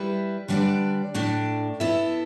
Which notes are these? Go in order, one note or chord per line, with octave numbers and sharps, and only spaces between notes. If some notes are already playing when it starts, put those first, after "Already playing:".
Already playing: G3 E4 B4 E5
D3 G3 D4 B4 D5
A2 A3 D4
B3 E4 A4 E5